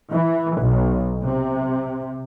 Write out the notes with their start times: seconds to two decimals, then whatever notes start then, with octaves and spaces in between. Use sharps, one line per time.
0.11 E3
0.59 B1
1.24 C3